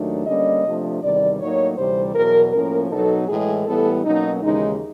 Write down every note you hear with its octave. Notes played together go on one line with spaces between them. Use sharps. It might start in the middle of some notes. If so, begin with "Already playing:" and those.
Already playing: D#2 D#3 F#3 A3 D4
D3 G3 A#3 C#4 D#5
C3 F3 A3 D4
E2 C3 D#3 G3 D5
A2 F#3 A#3 D#4 C#5
D2 C3 E3 G3 C4 C5
E2 B2 F#3 A#4
A2 F3 A#3 C#4 A#4
B2 F#3 B3 D#4 A4
A2 E3 G#3 G#4
A2 E3 G3 B3 A4
B2 F#3 A#3 C#4 D#4
D#2 C#3 E3 G#3 D#4